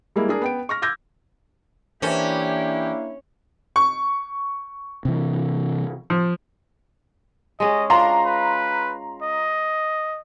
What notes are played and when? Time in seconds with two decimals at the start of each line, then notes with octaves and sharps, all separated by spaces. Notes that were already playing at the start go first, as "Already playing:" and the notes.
0.16 G3 G#3 A#3 E4
0.29 D4 G#4 A#4
0.42 B3 G5 D7
0.69 C#6 F6 A#6
0.82 D6 E6 G6 G#6 A#6
2.02 E3 A#3 C#4 D4 E4 G4 A4 C5
3.76 C#6
5.05 C3 E3
6.10 F3
7.60 G#3 C#4 D#5
7.90 D4 F4 A#5 C6
8.24 B4
9.22 D#5